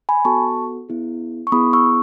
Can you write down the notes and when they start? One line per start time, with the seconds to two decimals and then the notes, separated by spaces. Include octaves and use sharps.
0.09 G#5 B5
0.25 B3 F#4 A4 A5 C#6
0.89 B3 E4 G#4
1.47 C#6
1.52 B3 E4 G#4 B5 D#6
1.73 C#6 E6